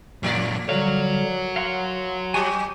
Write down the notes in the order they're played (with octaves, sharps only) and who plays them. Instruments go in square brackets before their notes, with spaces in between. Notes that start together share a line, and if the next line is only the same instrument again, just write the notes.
[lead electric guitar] F#2 A#2 [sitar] F3 A#4 D5
[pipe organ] D3 F#3 G3 [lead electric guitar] F#4 C#5 [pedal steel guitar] F5
[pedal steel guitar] F5 F#5 [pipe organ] C6
[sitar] F#3 [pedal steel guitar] G#5 C#6 D#6